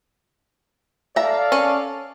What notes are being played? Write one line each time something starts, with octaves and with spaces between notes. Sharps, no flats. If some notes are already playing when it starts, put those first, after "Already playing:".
A4 D5 E5 F5 A#5
C#4